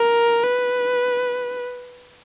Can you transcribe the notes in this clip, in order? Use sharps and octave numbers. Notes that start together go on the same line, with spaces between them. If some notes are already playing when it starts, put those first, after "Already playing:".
Already playing: A#4
B4